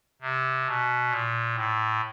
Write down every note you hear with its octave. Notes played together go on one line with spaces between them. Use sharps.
C3
B2
A#2
A2